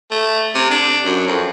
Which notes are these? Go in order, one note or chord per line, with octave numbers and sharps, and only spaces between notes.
A3
C3
D4
F#2
F2